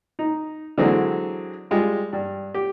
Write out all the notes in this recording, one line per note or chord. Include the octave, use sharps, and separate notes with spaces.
D#4
D3 E3 F#3 G#3 C4
G3 G#3 F4
G2
G4